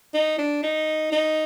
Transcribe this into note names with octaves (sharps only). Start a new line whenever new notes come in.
D#4
D4
D#4
D#4